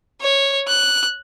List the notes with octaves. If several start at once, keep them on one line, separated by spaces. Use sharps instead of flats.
C#5
F#6